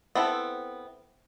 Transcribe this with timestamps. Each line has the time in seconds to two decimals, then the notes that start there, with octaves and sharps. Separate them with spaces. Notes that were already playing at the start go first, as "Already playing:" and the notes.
0.15 B3 C4 E4 A4